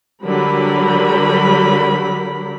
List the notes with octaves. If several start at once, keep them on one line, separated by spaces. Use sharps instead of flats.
D3 F#3 G3 A#4 B5